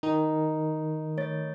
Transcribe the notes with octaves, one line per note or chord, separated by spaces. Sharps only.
D#3 D#4
A3 C#5 A6